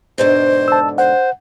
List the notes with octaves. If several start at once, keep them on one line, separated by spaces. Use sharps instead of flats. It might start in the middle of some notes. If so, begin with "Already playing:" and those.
G#2 B2 D3 C5
A5 E6
C5 F#5